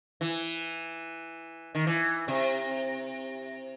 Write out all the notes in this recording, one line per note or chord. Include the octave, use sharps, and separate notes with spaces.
E3
D#3
E3
C3